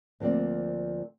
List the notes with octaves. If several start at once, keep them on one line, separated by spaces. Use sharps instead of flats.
D2 F3 A#3 C4 D5